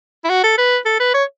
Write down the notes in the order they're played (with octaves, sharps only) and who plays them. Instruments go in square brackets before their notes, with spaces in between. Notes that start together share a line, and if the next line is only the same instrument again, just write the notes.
[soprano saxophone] E4
F#4
A4
B4
A4
B4
C#5